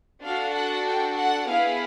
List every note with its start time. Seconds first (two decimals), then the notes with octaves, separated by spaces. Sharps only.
0.22 D4 F#4 A4 F5
0.55 F#5
0.86 G5
1.16 F#5
1.47 B3 E4 G#4 F5